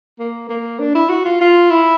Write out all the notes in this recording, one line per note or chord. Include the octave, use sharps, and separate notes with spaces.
A#3
A#3
D4
E4
F#4
F4
F4
E4